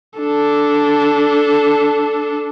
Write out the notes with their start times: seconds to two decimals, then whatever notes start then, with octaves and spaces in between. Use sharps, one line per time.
0.18 D4 A4